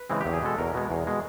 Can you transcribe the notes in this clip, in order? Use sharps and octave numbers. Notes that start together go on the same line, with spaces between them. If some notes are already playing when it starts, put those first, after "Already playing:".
Already playing: B4
C#3 E3 G#3 C4
E2 G4
G#4
B2 G#3 A4
E2 A#4
B2 G#3
E2
B2 G#3